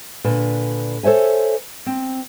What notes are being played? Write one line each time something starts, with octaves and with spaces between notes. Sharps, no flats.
A#2 D3 B4 G#5
A4 C5 C#5 E5 G#5
C4